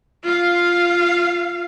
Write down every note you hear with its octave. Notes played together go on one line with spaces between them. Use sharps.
F4 F5